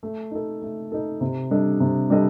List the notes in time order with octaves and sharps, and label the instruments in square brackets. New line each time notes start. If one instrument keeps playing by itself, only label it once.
[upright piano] A3
D#4 A4
A3
D#4 A4
C3
G3 D4 A4 D#5
C3
G3 D4 A4 D#5